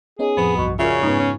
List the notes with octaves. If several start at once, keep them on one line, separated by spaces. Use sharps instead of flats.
B3 C#4 D#4 G#4
F2 A2 F3 B3 C4
B1 G2 B2 C#6
C#3 C#4 F4 F#4 A#4 D5 E5
G#2 G#3 B3 D#4 A#5
C#4